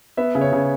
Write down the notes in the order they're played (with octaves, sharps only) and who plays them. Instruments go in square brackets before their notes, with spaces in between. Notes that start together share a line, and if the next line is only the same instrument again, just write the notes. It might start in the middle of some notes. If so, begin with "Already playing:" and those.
[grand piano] B3 E5
C#3
C#5
C#3